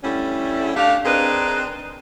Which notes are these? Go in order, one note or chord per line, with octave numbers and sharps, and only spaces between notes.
D3 G3 A3 C#4 E4
A3 D4 G4 F5
C4 D4 D#4 G#4 A#4 B4